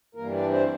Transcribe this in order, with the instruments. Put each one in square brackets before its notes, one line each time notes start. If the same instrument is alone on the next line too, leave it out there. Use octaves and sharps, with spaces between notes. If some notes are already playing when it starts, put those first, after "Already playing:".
[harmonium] G2 E3 G3 A#3 A#4
D4 D5
C4 C5